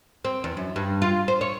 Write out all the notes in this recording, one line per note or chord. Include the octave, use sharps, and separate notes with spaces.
C4
E2
F#2
G2
F4
C5
C#5